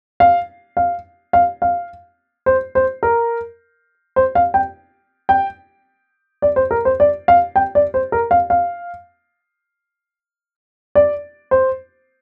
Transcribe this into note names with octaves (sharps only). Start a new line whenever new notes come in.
F5
F5
F5
F5
C5
C5
A#4
C5
F5
G5
G5
D5
C5
A#4
C5
D5
F5
G5
D5
C5
A#4
F5
F5
D5
C5